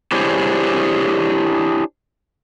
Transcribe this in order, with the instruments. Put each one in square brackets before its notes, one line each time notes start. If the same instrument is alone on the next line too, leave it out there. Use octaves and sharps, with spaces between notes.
[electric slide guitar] D4 E4 G4 G#4 C5 C#5